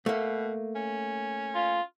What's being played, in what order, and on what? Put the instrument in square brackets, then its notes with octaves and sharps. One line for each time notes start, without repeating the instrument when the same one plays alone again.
[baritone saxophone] B2 [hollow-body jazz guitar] A3 A#3
[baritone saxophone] C#4
[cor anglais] F4